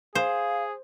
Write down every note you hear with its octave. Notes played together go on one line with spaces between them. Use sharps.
G#4 C5 F5